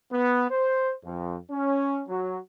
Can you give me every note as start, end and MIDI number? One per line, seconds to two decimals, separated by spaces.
0.11 0.45 59
0.50 0.91 72
1.03 1.35 41
1.49 2.01 61
2.08 2.37 54